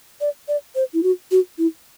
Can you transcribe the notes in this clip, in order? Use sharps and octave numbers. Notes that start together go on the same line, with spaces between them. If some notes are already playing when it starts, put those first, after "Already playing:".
D5
D5
C5
E4
F#4
F#4
E4